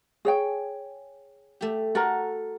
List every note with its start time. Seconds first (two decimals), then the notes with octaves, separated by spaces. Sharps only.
0.25 G#4 C#5 G5
1.61 A3 G4
1.95 F#4 A4 A#4 A#5